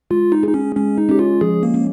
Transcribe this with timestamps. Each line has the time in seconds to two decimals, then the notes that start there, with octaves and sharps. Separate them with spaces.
0.11 G#3 F4
0.32 D#4
0.43 G#4
0.48 D#4
0.54 C#4
0.76 G#3 C#4
0.98 D#4
1.09 C#4 G4
1.19 F4
1.41 F3 G#4
1.63 A#3
1.74 C#4